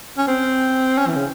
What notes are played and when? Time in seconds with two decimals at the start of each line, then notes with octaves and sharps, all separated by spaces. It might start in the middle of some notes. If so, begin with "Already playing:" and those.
0.18 C#4
0.27 C4
0.98 C#4
1.08 E3
1.16 C#3